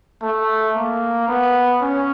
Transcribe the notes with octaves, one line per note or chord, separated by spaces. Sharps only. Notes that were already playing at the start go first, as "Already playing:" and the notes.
A3
A#3
B3
C#4